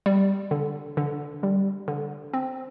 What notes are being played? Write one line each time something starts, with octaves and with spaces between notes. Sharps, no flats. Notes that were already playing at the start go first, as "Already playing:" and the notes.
G3
D3
D3
G3
D3
C4